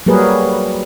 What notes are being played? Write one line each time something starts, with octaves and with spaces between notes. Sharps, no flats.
F#3 G3 A#3 G#4 A#4 B4